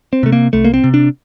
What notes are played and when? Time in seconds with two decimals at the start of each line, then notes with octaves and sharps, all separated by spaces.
0.13 C4
0.23 C3 A3
0.32 A#3
0.53 C2 A3
0.64 A#3
0.74 C4
0.84 C3
0.94 D4